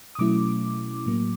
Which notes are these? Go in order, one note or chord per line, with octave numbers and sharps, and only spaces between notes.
D#6
B2 F#3 A3 C#4 E4 D6
A2 F#3 A#3